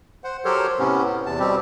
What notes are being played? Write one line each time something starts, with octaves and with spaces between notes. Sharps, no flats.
C5 F#5
F#3 G4 A4 A#4 C5 C#5
A2 C3 B3 C#4
B3
E2 C3 A5
B2 G3 C4 G4